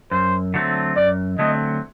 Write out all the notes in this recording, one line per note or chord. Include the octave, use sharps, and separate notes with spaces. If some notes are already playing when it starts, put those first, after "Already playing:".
F#2 C5
D3 F#3 A3 C4
F#2 D5
D3 F#3 A3 C4 D#5